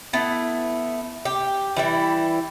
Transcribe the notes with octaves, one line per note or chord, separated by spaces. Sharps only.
A3 B3 E4
G4
E3 G3 E4